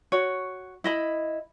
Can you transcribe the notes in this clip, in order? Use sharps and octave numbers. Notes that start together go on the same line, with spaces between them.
F#4 C#5
E4 D#5 B5